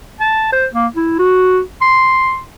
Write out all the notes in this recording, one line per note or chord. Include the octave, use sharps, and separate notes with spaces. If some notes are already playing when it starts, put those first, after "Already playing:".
A5
C5
A#3
E4
F#4
C6